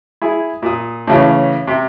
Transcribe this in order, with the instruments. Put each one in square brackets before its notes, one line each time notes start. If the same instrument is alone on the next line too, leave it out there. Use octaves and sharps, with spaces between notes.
[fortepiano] E4 G#4
A#2 D#6
A2 C#3 E3
C3